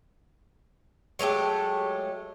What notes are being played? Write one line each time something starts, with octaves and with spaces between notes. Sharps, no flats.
F#3 G#3 A3 G4